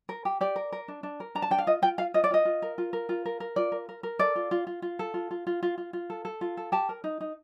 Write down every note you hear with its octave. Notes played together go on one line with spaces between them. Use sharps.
A#4
G4
G4 D5
A#4
A#4
D4
D4
A#4
D4 A#5
A5
D4 G5
F5
F4 D#5
F4 G5
F4 F5
F4 D#5
D5
F4 D#5
F4
A#4
F4
A#4
F4
A#4
A#4
F4 D5
A#4
A#4
A#4
A4 D5
F4
F4
F4
F4
A4
F4
F4
F4
F4
F4
F4
A4
A4
F4
A4
G4 A5
A#4
D#4
D#4